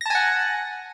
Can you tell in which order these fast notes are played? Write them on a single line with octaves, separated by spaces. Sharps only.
A#6 A5 G#5 F#5